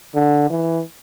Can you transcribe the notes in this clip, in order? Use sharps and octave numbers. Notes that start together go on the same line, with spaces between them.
D3
E3